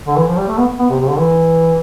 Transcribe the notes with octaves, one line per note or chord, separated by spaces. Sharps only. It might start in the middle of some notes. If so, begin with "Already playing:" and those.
D3
E3
F3
G3
A3
B3
B3
C3
C3
D3
E3